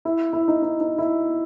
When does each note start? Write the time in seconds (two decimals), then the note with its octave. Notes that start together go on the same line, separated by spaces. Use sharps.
0.05 E4
0.33 E4
0.48 D#4
0.62 D#4
0.80 D#4
0.98 E4